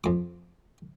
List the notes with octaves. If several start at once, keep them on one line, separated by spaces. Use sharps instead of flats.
F2 D6